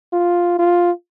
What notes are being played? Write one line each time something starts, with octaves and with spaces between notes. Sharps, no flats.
F4
F4